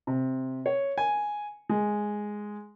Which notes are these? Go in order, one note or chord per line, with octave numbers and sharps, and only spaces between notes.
C3
C#5
G#5
G#3